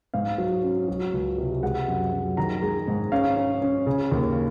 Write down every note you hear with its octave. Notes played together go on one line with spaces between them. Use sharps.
G#2 F5
F#3
C#4
F#3
C#2
C3
G#3 F#5
F#2
F#2
D#3 A#5
G#3
G#2
C#4 F5
C#4
C#4
C#3
D#2